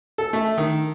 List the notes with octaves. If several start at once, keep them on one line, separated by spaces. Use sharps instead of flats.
A4
A3
D#3